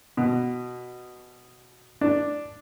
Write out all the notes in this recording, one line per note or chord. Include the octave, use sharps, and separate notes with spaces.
B2
D4